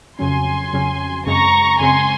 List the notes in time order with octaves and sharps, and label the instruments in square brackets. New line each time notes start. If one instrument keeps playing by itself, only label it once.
[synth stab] F2 C#3 F#3 C#4 [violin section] G#5 C6
[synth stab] F2 C#3 F#3 C#4
[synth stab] F#2 C#3 G#3 C4 [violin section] A#5 C#6
[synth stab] F#2 C#3 G#3 C4 [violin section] G#5 C6